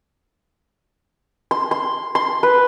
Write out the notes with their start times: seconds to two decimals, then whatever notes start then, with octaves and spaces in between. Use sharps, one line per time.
1.51 C6
1.71 C6
2.15 C6
2.43 B4